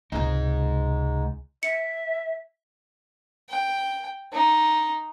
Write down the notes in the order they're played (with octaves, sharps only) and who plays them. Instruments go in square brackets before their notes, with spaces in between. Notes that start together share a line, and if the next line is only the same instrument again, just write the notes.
[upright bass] C#2 C3 [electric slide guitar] G#3 D#4
[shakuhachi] E5 [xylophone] C#7
[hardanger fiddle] G5
D#4